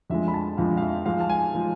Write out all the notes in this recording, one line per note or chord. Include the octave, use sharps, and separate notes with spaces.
F2 D3 F3 G#3 E5
B5
A5
F2 D3 F3 G#3 F5
F5
E5
G#2 F3 G#3 F5
A5
G#5
F3 G#3